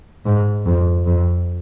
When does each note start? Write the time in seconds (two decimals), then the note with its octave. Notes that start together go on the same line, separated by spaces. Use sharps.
0.26 G#2
0.66 F2
1.06 F2